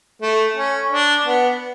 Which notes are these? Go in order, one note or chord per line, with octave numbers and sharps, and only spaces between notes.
A3
C#4
D4
B3